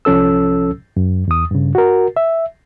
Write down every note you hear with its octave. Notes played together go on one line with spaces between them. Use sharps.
C2 F3 C#4 A4 E6
F#2
E2 D#6
G2 C#3
F#4 A#4
E5